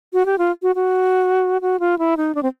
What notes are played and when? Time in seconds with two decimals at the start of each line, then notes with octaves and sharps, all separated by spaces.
0.13 F#4
0.26 G4
0.38 F4
0.62 F#4
0.75 F#4
1.62 F#4
1.80 F4
1.99 E4
2.17 D#4
2.35 D4
2.43 C4